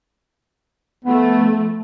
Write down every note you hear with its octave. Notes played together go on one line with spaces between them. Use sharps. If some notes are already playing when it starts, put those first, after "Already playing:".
F3 A3 B3